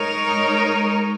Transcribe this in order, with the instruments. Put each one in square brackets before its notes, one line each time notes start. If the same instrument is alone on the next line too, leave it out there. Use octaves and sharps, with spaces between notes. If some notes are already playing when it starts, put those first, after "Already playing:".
Already playing: [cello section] G#3 D#4 A#4 C#5